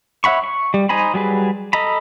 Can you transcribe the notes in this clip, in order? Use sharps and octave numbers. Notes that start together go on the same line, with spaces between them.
C#5 E5 F#5 B5 C#6
C#6
G3
D#4 C5 G#5 A#5 B5
F#3 G3 G#4 B4
A4 D#5 A#5 B5